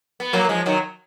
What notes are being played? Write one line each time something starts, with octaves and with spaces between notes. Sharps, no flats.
B3
F#3 A#3
A#3
F3 G#3
D#3 F#3